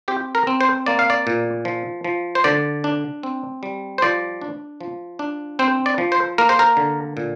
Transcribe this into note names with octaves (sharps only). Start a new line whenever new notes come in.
C4 G4
A#4
C4
C5
A#3 D5
F5
D5
A#2
F3
F3
C5
D3 D5
D4
C4
G3
C5
F3 D5
D4
F3
D4
C4 C5
D5
F3
C5
A#3 A#4
C5
A#4
D3
A#2